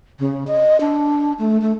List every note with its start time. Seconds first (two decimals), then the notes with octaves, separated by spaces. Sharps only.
0.19 C#3
0.47 D#5
0.80 D4
1.39 A3
1.62 A3